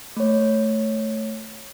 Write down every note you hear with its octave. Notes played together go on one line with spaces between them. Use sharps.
A3 C#5